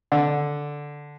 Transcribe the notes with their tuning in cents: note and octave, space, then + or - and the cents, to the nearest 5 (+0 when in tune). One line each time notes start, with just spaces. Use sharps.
D3 -5